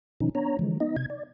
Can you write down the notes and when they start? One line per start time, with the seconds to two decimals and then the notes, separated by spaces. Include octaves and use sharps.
0.20 B2 D#3 F3 C#4 D#4
0.35 B3 D4 C#5 A#5
0.59 D3 E3 F3 G#3
0.80 B3 D#4 D#5
0.96 C3 G#6
1.10 D5